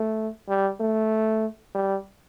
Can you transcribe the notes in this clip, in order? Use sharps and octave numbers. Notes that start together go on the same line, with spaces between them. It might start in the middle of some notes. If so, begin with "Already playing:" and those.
Already playing: A3
G3
A3
G3